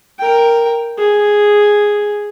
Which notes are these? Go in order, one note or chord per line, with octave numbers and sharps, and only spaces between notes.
A#4 G5
G#4